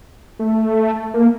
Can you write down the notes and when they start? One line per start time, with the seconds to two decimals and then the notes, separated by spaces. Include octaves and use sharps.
0.39 A3
1.14 A#3